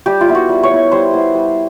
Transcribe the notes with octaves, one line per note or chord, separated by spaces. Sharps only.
G3 G4
F4
B3 E4
F#4
G3
C#5
B3 E4
G3 C5
B3 E4
G3